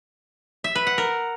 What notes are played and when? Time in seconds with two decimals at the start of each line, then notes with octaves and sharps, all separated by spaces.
0.64 E5
0.75 B4
0.87 F#5
0.98 A#4